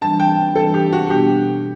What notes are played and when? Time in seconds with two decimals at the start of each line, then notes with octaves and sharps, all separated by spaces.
0.02 E3 G3 D4 A5
0.19 G5
0.55 E3 G3 D4 A4
0.74 G4
0.93 F#4
1.10 B2 G3 B3 D4 G4